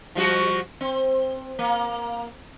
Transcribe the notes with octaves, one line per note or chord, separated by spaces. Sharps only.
F3 G3 F#4
C4
A#3